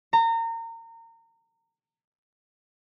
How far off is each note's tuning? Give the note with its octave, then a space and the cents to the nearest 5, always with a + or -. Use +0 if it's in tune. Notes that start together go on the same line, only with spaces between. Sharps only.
A#5 -30